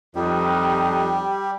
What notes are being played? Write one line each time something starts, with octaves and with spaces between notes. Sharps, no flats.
F2 G3 D#4 G4